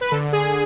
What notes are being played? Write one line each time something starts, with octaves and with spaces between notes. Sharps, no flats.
B4
D3 A4
D3
G#4